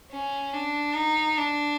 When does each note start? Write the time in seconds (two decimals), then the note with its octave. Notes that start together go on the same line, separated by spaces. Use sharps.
0.12 C#4
0.53 D4
0.96 D#4
1.38 D4